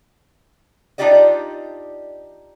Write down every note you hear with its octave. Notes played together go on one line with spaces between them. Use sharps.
D4 D#4 F4 G4 D5 D#5